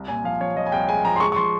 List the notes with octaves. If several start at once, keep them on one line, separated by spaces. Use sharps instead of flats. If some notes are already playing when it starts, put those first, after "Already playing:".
Already playing: C2
A#2 G#5
F3 F5
F3 C#5
F3 D#5
G#5
C2 G5
G#3 G#5
F3 A#5
C6
G#3 C#6
C#6
F3 C6